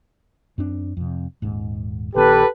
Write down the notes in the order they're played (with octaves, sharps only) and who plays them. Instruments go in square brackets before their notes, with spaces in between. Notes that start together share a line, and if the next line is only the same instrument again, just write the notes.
[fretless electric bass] F#2 C4 D4
F2 C3
D#1 G#2
[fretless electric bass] A#1 D#3 B3 [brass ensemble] G4 A4 B4